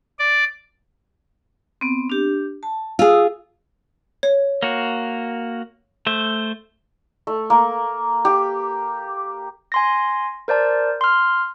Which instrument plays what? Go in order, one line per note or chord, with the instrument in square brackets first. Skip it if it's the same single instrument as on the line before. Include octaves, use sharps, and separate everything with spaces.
[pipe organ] D5
[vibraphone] B3 C4
D4 G4
A5
[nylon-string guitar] F4 G#4 [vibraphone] D#6 E6
[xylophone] C#5
[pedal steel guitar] A#3 F#4
A3 C5
[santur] A3
A#3
G4
[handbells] G#5 C6 A#6
A#4 C5 D5 A5
C6 F6